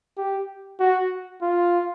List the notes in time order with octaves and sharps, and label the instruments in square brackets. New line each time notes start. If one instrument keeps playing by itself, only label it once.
[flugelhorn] G4
F#4
F4